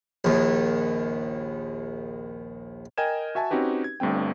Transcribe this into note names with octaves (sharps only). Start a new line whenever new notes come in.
A#1 D#2
A#4 D#5 G5 G#5 G#6 E7
F#4 E5 G#5 A5
C4 C#4 D#4 F#4 G4 B4
G#6
G1 G2 A3 C4 G5